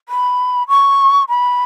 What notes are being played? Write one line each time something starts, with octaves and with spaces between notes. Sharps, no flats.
B5
C#6
B5